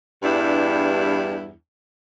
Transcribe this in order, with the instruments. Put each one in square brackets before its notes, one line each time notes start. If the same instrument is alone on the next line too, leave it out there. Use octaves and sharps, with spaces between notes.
[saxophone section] E2 G2 G3 D4 E4